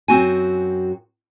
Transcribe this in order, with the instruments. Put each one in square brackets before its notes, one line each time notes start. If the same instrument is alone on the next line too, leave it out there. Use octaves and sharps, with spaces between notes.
[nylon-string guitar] F#2 C4 F#4 G#5